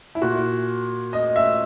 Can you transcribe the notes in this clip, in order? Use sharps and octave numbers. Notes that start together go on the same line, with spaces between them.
E4
A#2 F#4
D#5
E5